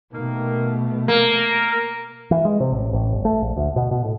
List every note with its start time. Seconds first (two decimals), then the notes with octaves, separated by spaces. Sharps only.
0.13 B2 D#3 A3 A#3
1.08 A#3 A#4
2.31 E3
2.45 G#3
2.60 C3
2.72 A1
2.93 A1
3.13 G1
3.25 A3
3.42 A#1
3.57 D2
3.76 B2
3.91 B2
4.04 A2